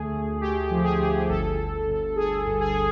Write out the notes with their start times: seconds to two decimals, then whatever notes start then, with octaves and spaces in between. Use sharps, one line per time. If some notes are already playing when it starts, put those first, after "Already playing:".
Already playing: D2 A3 G#4
0.12 D2
0.41 A3 G4
0.70 F3
0.84 G#4
0.99 D2
1.29 G1 A4
1.58 G1
1.87 G1
2.16 G1 G#4
2.46 G2
2.61 G#4